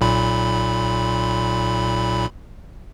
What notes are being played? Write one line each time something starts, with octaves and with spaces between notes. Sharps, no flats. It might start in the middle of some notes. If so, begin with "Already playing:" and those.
B1 A#2 B5